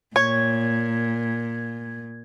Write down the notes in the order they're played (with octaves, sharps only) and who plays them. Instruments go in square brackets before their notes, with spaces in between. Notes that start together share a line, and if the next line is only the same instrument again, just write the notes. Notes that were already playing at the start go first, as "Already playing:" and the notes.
[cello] A#2 [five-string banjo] C#5 [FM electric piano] G#6